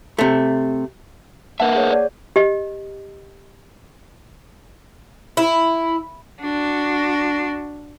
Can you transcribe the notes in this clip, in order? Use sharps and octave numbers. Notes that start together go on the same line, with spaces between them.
C3 A3
A#3 A#4 B4 E5 F#5 A5
G#4 C#5
D5
G4 D#5
E4
D4 F#4